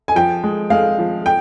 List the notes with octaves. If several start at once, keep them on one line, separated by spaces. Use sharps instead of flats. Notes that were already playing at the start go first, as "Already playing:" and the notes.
G#5
F3 G5
G#3
G#3 F5
F3
G5